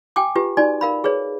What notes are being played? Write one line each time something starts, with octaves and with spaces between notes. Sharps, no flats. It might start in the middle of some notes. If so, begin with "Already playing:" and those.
G5 G#5 D6
F4 G4 B4
D#4 F#4 D5 G#5
A#4 F5 B5
G#4 B4 C#5